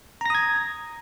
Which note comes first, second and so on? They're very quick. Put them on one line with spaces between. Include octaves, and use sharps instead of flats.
A#5 A#6 D#6 G#6